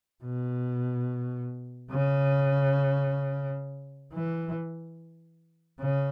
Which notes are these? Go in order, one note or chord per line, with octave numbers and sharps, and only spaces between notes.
B2
C#3
E3
C#3